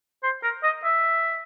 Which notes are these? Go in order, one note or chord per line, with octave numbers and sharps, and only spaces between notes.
C5
A#4
D#5
E5